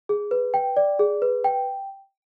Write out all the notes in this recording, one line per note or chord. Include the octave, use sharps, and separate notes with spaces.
G#4
B4
G5
D5
G#4
B4
G5